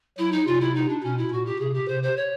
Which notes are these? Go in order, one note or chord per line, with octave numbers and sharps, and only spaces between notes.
F#3 E4
D#4
C3 F4
E4
D#4
D4
B2 C#4
E4
A#2 F#4
G4
C3 G#4
G4
C3 C5
C5
C#5